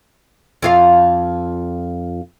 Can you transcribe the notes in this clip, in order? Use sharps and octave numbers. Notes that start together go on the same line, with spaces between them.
F2 F4 F5